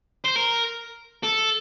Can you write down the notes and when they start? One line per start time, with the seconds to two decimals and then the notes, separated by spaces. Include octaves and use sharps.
0.24 C5
0.35 A#4
1.24 A4